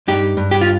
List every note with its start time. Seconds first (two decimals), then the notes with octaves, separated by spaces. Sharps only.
0.08 G2 D#4 G4
0.37 G2
0.51 G4
0.61 F4